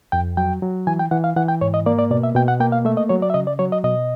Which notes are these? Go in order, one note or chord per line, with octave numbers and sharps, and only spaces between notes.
F2 G5
F#3 G5
F#3
E3 G#5
G5
E3 F#5
F5
E3 F#5
G5
G#2 C#5
D#5
A#3 D5
D5
B2 D5
E5
B2 G5
F#5
A#3 G5
F5
A3 E5
D#5
F#3 C#5
D5
E5
C#3 D#5
D5
F#3 C#5
D#5
B2 D#5